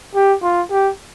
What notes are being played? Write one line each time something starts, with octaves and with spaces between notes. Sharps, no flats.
G4
F4
G4